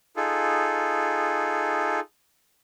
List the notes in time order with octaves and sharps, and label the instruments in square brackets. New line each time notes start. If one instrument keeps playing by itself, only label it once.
[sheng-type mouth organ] D#4 F4 G#4 A4